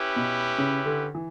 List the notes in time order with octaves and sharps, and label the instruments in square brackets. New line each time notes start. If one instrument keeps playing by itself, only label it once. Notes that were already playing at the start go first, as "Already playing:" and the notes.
Already playing: [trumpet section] C#4 E4 G4 B4
[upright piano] B2
C#3
D3
E3